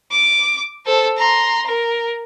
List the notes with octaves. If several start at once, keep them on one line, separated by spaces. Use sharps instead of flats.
D6
A4 C5
A#5 C6
A#4